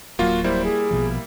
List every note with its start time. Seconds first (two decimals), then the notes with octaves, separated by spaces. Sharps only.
0.19 D1 F#3 A#3 F4 F#4
0.44 G3 A#3 E4 C5
0.65 G#4
0.91 A#1 B2 F3